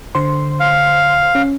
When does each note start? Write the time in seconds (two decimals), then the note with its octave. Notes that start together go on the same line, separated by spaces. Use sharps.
0.15 D3 C5 C6
0.60 F5
1.35 C#4